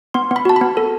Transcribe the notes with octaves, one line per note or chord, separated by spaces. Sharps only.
B3 C6
B3
B5
F#4 A5
B5
B3
A4